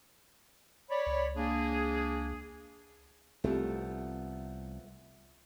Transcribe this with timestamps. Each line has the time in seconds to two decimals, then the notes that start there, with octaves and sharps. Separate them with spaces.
0.90 C#5 D5 B5
1.07 C#2
1.37 A#3 D4 G#4
3.44 C2 F3 A3 B3 C4 G4